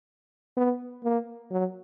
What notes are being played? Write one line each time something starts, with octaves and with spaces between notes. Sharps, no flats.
B3
A#3
F#3